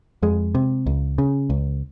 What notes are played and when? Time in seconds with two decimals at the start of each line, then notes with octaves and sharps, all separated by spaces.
0.22 F2 G#3
0.55 C3
0.86 C#2
1.18 C#3
1.50 C#2